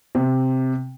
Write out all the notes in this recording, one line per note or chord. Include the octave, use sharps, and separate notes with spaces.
C3